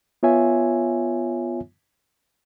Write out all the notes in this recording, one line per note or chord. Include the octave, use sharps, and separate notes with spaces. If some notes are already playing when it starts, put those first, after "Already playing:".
B3 F4 C#5 E5 G#5